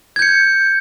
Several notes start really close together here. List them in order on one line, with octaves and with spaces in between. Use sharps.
G#6 G6 C#7